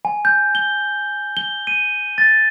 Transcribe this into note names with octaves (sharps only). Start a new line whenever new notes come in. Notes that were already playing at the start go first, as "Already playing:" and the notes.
G#5
G6
G7
G7
D#7
A6